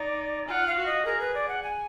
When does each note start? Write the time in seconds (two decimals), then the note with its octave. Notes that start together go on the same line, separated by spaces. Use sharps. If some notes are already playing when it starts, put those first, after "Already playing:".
Already playing: D#4 D5
0.48 F4 F#5 G#5
0.68 F5
0.77 F#4
0.86 D#5
1.05 G#4 A#4
1.20 B4
1.34 D5
1.48 F#5
1.63 G#5